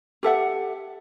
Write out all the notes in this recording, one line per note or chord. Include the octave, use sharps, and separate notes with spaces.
G4 A4 E5 F#5